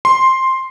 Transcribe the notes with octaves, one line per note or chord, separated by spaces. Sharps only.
C6